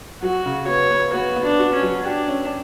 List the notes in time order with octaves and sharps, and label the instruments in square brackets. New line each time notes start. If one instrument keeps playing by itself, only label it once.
[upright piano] F#3 [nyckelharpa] F#4
[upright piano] C#3
[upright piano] B3 [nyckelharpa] C#5
[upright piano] B3
[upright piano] B3 [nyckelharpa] F#4
[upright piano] B3
[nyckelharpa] D4
[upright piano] F#4
[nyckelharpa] C#4
[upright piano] F#3
[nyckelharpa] D4 [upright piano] G4
[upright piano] C#4